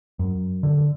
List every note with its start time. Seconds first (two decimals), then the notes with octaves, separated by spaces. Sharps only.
0.19 F#2
0.63 D3